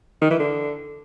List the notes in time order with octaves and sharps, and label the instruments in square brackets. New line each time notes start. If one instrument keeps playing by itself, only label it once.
[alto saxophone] D#3
E3
D3